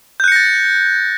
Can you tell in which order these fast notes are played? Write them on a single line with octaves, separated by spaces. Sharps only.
G6 F#6 C#7 A#6 A6